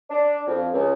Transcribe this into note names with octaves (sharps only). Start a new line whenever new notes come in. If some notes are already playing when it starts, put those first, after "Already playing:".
D4
F2
C#2